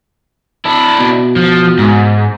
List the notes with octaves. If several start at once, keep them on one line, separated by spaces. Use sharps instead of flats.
D4 E4
B2
F3
G#2